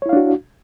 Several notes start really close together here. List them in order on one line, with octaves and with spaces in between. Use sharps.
C#5 E4 F5 D4 F#4